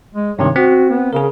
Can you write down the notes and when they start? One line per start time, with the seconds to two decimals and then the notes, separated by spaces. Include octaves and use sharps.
0.14 G#3
0.39 G2 C3 D#3 C#5
0.56 C4 F#4
0.89 B3
1.13 C#3 G#4 A#4